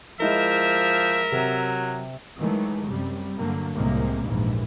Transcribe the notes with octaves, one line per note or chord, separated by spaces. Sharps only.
F3 G#3 E4 A#4 D#5 E5
C3 F#3
D#3 E3 F#3 G#3 A3
F#2 C3 G3
G2 D3 F#3 A#3
C2 A2 C3 G#3 A#3
A#1 D#2 G#2 E3